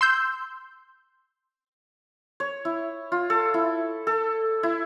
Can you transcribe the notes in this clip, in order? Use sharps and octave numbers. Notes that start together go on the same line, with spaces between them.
C6 E6 G6
C#5
E4
F4
A4
E4
A4
E4